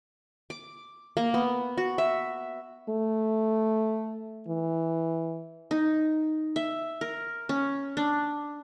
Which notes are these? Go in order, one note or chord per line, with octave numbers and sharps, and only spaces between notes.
D6
A#3
B3
F#4
E5
A3
E3
D#4
E5
A#4
C#4
D4